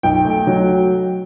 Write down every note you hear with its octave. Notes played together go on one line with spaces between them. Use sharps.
B1 G5
A3
F#3